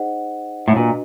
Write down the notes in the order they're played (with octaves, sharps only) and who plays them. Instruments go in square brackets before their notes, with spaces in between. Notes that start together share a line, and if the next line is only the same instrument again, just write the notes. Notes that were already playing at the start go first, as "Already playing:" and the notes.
Already playing: [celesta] D#4 G#4 C5 D#5 F#5
[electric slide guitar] A2
[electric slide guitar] A#2 [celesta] D4 F#4 B4 D#5